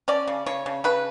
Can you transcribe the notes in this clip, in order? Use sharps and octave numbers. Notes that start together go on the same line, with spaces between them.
C#4 D5
C#3
C#3 C#5
C#3
C#3 B4